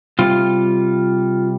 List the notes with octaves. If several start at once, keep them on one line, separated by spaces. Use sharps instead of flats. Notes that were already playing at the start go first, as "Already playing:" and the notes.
C3 G3 F4